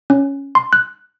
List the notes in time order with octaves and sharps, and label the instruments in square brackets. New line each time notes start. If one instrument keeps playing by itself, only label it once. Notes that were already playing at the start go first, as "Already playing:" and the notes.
[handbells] C#4
C6
F#6